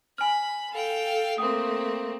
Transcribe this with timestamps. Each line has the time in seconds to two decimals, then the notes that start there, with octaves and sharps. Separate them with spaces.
0.18 G#5 B5 F6
0.72 A4 F5 G5
1.38 A3 A#3 C4 D#6